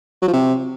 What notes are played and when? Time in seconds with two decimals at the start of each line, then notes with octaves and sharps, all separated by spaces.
0.22 F#3
0.28 F3
0.33 C3